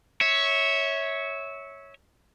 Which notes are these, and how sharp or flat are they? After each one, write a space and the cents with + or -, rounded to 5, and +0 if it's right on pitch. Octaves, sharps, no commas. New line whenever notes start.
C#5 +0 E5 -20